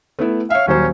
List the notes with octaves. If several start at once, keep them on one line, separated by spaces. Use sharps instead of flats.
A3 B3 E4
C#5 E5 F5
D#1 F#3 C#4 C5